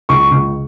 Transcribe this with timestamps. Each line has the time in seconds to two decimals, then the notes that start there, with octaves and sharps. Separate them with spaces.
0.09 C#2 C#6
0.31 C#2